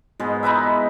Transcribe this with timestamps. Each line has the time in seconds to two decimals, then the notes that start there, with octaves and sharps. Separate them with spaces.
0.20 G#2 B2 G#3
0.43 D#4 E4 B4 E5